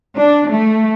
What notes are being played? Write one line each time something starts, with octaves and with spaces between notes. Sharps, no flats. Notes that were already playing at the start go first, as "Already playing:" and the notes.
D4
A3